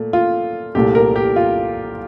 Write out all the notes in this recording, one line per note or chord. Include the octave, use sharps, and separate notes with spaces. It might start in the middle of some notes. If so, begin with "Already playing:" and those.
Already playing: A#2 A3
F4
C2 A#2 A3 G4
A#4
G4
F4